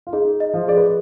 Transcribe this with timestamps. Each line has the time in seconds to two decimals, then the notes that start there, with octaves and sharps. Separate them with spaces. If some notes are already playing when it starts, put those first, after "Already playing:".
0.07 F4
0.13 D#4 G#4
0.40 D#5
0.54 F3 F4
0.68 G#4 D5
0.77 B4